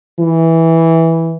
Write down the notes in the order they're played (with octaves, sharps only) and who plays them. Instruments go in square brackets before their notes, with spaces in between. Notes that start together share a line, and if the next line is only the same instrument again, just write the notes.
[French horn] E3